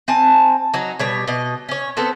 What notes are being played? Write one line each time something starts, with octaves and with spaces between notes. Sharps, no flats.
C4 G#5 A5
F#3 D#4
B2 G3 C#5
B2 D#5
C#4 C#5
B3 C4 A4 C5